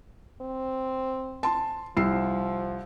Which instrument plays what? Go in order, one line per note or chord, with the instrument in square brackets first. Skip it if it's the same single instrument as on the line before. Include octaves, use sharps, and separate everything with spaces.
[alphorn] C4
[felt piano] A5 C6
[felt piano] C2 E6 C7 [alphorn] F3